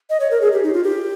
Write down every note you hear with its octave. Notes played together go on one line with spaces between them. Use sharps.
D#5
C#5
A#4
G#4
G4
D#4
F4
G4